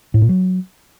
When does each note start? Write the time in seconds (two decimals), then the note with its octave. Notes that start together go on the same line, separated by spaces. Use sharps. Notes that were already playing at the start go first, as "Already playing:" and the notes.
0.14 A2
0.22 A#2
0.29 F#3